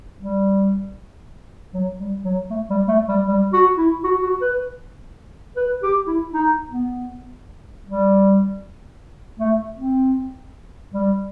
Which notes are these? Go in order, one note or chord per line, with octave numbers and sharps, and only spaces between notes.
G3
F#3
G3
F#3
A3
G3
A3
G3
G3
F#4
E4
F#4
F#4
B4
B4
G4
E4
D#4
B3
G3
A3
C4
G3